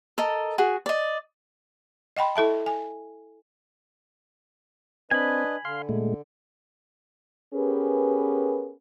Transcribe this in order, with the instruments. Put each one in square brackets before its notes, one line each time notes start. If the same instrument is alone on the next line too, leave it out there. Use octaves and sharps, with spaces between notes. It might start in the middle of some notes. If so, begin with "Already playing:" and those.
[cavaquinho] A4 A#4 D#5
F#4 G#4
D5 D#5
[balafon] D#5 F#5 G5 B5 C6
E4 A4 E5 A5
G#5
[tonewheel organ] C4 [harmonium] D4 B4 D#5 [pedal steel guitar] G#5 B5
[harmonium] D3 [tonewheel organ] F5 C6
[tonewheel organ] A#2 G#3 A3
[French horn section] B3 C#4 G4 G#4 A#4 B4